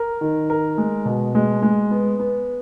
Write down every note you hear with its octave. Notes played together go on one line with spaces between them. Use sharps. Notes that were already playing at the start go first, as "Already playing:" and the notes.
Already playing: A#4
D#3
A#4
G#3
B2
G#3
G#3
B3
B3